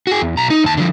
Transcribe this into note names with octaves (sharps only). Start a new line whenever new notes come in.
F#4 G#4
E2
B1 A#5
D#4
D#2 A5
D3 F3